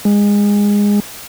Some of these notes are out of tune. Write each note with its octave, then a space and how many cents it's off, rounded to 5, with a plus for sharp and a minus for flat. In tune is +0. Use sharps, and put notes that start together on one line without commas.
G#3 -20